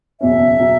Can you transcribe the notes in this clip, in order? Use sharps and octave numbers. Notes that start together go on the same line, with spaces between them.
F#1 E2 B2 F#3 C#4 E5
B2 F#3 C#4